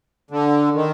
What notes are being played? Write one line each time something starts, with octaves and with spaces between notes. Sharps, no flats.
D3
D#3